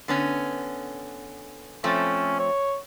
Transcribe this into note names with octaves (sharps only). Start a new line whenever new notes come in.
D3 B3 C#4
F3 A3 C4 C#4
C#5